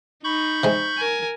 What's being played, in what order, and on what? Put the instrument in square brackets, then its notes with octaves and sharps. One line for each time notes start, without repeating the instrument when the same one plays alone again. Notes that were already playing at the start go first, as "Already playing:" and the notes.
[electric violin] D#4 [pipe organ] B5 C#6 G6
[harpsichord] C3 G#3
[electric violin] A#4 G#5